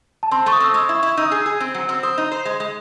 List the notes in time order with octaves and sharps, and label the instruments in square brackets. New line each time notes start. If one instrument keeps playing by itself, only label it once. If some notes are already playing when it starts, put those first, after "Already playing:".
[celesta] A5
[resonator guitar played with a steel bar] C4 [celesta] C6
[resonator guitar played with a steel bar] A3 [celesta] C#6
[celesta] D#6
[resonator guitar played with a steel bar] C4 [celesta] E6
[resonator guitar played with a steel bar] G#3 [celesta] D#6
[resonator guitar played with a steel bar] E4
[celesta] C#6
[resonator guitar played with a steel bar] E4
[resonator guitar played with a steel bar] D#4 [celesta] E6
[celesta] D#6
[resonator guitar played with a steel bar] G#4 [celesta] E6
[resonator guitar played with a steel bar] G#4
C4
F#3
[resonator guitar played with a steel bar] C4 [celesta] E6
[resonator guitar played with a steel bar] C5 [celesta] D#6
[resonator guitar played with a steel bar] D#4
C5
G#3
G#3